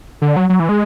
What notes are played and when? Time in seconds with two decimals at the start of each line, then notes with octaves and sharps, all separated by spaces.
0.22 D3
0.36 F#3
0.49 F#3
0.60 E3
0.69 G#3